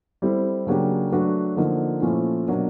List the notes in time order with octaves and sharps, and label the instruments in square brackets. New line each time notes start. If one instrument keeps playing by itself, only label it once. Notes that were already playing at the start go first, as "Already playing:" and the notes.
[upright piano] G3 C4 E4 A4
C#3 F#3 A#3 D4 G4
F#3 A3 D4 F#4 B4
D3 F3 A#3 D#4
A#2 F3 A3 C#4 E4
B2 F#3 A#3 D4